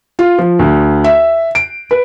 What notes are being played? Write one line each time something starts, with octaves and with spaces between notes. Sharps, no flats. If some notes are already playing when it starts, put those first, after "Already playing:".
F4
F3
D2
E5
D7
B4